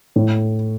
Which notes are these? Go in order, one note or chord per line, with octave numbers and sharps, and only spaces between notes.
A2